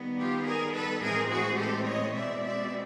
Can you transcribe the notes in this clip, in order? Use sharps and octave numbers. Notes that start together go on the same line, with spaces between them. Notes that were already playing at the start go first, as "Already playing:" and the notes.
Already playing: D#3 G3 B3
F4 G4
G#4 A#4
A4 B4
A2 E3 G#3 C4 G#4 A#4
F#4 G#4
G4 A4
C#5 D#5
B2 G#3 C4 D5 E5
D5 E5